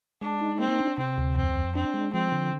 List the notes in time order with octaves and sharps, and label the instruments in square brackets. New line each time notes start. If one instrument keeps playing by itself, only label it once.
[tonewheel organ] G#3 [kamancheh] D4
[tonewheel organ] D#4
[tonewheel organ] A#3 [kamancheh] C4
[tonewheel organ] D4
[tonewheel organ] C3 [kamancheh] C4
[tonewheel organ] D2
[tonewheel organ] F2 [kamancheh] C4
[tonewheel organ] F2
[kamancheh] C4 [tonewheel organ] D4
[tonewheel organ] G#3
[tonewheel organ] F3 [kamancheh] C4
[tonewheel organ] D3